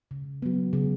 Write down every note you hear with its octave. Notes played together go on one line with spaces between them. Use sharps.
C#3
F#3 B3
C#3